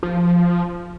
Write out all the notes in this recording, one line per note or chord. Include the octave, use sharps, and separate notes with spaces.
F3